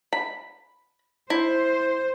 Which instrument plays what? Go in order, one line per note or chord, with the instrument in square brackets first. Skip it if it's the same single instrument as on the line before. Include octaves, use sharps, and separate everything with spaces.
[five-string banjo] B5
[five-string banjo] E4 [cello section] C5